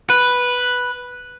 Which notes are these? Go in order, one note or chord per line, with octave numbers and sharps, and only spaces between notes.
B4